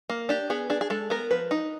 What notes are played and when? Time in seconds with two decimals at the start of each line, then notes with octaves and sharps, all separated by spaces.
0.10 A#3
0.29 D4 G4
0.50 B3 G#4
0.70 D4 G#4
0.81 G#4
0.90 G#3 A4
1.10 B3 A#4
1.31 F3 B4
1.51 D#4